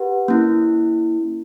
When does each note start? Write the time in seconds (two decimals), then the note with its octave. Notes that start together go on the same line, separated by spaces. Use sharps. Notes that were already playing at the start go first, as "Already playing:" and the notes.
Already playing: G4 B4 F#5
0.28 A#3 C#4 E4